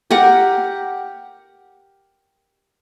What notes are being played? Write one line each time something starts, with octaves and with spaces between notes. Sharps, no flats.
G4 A#4 F#5